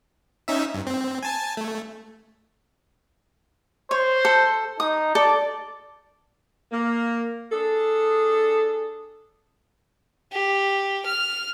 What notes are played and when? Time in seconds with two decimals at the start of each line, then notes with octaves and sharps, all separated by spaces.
0.48 C#4 D#4 E5
0.74 G2
0.87 C4
1.23 G#5 A5
1.57 A3
3.91 C5 C#5
4.25 A4
4.80 D#4 D#6
5.15 A4 D5
6.72 A#3
7.52 D4 G#4 A4
10.33 G4
11.06 F6